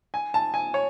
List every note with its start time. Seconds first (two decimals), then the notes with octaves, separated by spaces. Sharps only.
0.14 G#5
0.34 A5
0.54 G#5
0.74 C#5